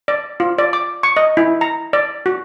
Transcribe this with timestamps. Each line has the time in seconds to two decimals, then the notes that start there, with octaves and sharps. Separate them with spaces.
0.08 D5
0.40 F4
0.58 D5
0.73 D6
1.03 C#6
1.17 D#5
1.37 E4
1.61 A#5
1.93 D5
2.26 F#4